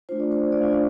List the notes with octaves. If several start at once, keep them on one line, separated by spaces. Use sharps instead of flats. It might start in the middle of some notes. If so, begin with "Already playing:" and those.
A3 D4 F4 C5
D5
C5
D5
A3 D4 F4 F5